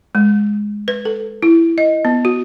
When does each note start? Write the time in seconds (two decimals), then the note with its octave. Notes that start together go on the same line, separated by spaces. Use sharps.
0.15 G#3
0.88 B4
1.05 A4
1.43 E4
1.78 D#5
2.05 B3
2.25 F#4